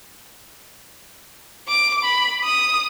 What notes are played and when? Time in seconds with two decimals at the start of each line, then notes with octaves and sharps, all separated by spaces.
1.69 D6
2.04 B5
2.44 D#6